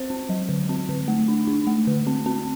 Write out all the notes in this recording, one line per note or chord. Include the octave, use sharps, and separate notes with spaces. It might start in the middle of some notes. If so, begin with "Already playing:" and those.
Already playing: C4 C5
C4
F#3
D3
C4
D3
A3
D4
D4
A3
D3
C4
C4